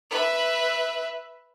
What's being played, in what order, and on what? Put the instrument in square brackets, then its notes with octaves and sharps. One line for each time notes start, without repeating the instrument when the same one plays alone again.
[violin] B4 E5